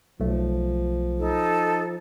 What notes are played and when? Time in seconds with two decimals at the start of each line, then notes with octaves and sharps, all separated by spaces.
0.20 B1 F3 A3
1.19 D#4 A4